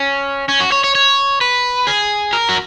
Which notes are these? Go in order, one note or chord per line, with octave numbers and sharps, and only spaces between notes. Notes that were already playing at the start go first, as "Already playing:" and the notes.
Already playing: C#4
C#4
F#4
C#5
C#5
C#5
B4
G#4
A#4
F#4